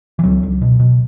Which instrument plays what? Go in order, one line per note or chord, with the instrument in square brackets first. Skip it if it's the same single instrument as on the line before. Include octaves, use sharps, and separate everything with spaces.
[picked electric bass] E3
C#2 F#3
C#2
B2
B2